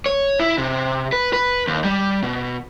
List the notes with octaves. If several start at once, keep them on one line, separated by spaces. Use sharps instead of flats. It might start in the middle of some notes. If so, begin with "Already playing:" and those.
C#5
E4
C3
B4
B4
D#2
G3
B2